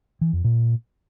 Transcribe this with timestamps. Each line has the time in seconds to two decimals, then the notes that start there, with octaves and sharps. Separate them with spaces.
0.21 E3
0.33 F2
0.44 A#2